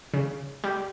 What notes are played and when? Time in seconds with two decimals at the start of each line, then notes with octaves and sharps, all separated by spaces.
0.14 C#3
0.64 G3